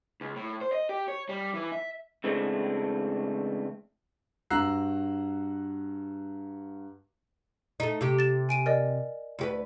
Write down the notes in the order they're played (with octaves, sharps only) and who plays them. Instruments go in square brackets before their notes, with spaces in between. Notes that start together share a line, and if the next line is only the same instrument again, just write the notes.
[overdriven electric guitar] C#2
A2
C5
D#5
G4
C#5
G3
E3
E5
[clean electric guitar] C#3 E3 G#3 A3 C4 D4
[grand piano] G2 F#4 A#5 E6 F#6 C7
[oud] A3 D#4
C3 G4
[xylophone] A6 E7
G#5 D7 D#7
A#4 D5 D#5
[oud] D2 G4 B4